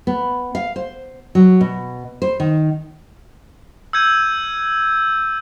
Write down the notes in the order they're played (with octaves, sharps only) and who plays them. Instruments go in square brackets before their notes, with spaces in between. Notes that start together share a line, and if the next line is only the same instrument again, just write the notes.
[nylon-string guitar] B3
F5
C5
F#3
B2
C5
D#3
[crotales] E6 G6 G#6 D#7